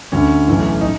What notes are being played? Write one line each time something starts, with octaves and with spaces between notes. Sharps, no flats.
D2 D3 C#4
B1 A2 E3
D#4